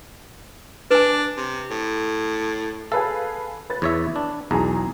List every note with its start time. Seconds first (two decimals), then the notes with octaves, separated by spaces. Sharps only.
0.91 D4 B4 G#5
1.37 C3
1.70 A2
2.92 G#4 A4 B4 F5
3.70 B4 A6
3.82 E2 C#5 E5
4.16 D4
4.51 B1 E2 G#4 A#5